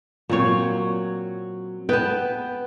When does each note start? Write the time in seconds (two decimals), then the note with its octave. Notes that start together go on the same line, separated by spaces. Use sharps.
0.29 A#2 F#3 C4 C#5
1.89 B3 B4 G5 A5